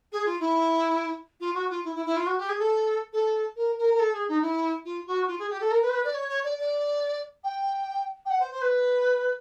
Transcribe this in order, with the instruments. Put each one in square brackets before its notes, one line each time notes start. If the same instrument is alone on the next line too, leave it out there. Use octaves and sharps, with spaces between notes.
[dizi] G#4
F4
E4
F4
F#4
F4
E4
E4
E4
F4
F#4
G4
G#4
A4
A4
A#4
A#4
A#4
A4
G#4
D#4
E4
F4
F#4
F4
G#4
G4
A4
A#4
B4
C5
B4
D5
C#5
C#5
D5
D5
G5
G5
F#5
C5
C5
B4